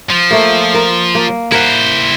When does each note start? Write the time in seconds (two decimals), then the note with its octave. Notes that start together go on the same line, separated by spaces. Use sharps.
0.10 F3
0.31 A3 A#3
0.74 A#4
1.15 A#3
1.52 E4 A#4 C5 F#5